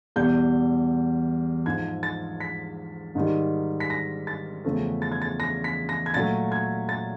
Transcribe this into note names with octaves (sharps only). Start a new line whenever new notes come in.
E2 B2 G3 G6
G#2 F3 G#3 G#6
A6
B6
G#2 D#3 G3
B6
A#6
A6
E2 C#3 F3 A3
A6
G#6
A6
A#6
B6
A#6
G#6
A#2 F#3 A3 A6
G#6
A6